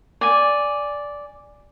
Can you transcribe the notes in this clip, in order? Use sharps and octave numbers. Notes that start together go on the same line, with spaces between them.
D5 G#5